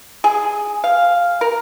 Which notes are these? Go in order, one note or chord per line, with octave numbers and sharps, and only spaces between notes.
G#4
F5
A#4